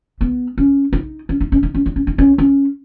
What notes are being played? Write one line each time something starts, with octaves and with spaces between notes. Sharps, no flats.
B3
C#4
D#4
C#4
D#4
C#4
D#4
C#4
D#4
C#4
D#4
C#4
C#4